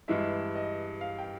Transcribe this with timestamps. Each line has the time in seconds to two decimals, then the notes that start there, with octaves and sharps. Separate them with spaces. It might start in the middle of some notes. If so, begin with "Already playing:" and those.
0.08 G2 E3 G#3 E5
0.55 D#5
1.01 F5
1.18 G5